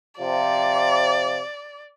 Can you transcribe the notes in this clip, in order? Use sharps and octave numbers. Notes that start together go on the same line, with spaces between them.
C3 F3 D5